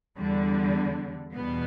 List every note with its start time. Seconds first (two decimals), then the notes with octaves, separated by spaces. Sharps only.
0.17 E2 D3 G3
1.33 E2 B2 G3 B3